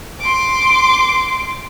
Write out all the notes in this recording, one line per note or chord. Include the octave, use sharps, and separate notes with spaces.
C6 D6